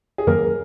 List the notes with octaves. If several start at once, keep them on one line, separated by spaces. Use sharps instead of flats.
G#4
F#2 D#3 F#3 A#3 A#4